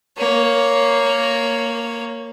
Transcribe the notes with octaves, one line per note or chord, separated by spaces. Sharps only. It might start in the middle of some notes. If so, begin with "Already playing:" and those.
A#3 C#5